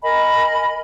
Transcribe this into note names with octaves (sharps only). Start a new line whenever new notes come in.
A#4 D#5 G#5 B5